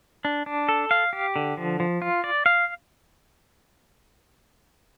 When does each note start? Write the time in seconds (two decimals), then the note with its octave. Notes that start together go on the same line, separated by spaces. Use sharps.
0.25 D4
0.46 D4
0.69 A4
0.91 F5
1.13 G4
1.36 D3
1.57 F3
1.80 F3
2.02 F4
2.24 D5
2.46 F5